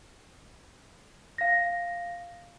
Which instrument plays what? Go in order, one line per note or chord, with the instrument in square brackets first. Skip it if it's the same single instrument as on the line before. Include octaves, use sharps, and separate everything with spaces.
[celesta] F5 A#6